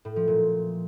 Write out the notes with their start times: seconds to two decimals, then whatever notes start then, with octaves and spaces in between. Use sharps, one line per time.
0.05 A2
0.16 F3
0.28 A#2